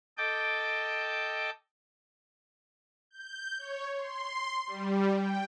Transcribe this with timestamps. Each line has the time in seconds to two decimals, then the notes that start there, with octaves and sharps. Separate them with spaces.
0.18 A4 D#5 G5 A5 D6 G6
3.11 G6
3.59 C#5
3.97 C6
4.67 G3
5.14 G5